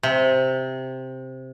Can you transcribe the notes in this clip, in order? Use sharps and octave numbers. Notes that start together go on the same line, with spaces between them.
C3